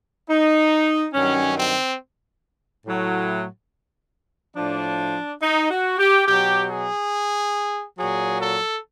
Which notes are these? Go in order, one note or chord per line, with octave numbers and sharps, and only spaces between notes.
D#4
G2 D#3 F#3 C#4
C4
A2 F#3
A2 F3 D4
D#4
F#4
G4
B2 F#3 G4
G#4
A#2 F#3 G#4
A4